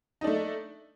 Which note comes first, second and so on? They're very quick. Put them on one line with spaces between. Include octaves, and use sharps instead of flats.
D#4 D4 A3